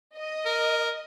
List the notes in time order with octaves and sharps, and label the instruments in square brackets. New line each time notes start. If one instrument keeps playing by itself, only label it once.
[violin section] D#5
[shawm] A#4